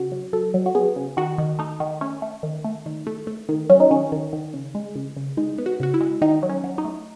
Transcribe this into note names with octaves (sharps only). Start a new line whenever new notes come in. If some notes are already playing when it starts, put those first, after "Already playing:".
Already playing: C#3 F#4
F#3
F#3 A4
F#3
F#4
B3 G#4
C#3
D#3 F#4
D#3
A3 D#4
D#3
A3 C#4
A3
D#3
A3
D#3
A3
A3
D#3
F#3 C#4
D#4
D#3 C#4
D#3
D#3
C#3
G#3
C#3
C#3
G#3 D#4
B3
F#4
C#3 F#4
E4
G#3
D#3 D#4
F#3
C#4
F#3
D#4
A3